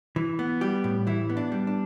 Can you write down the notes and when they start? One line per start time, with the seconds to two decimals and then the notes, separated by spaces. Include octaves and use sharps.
0.16 E3
0.39 B3
0.61 G3 G4
0.84 A2
1.07 E3 E4
1.29 B3
1.37 D4
1.52 G3
1.67 D4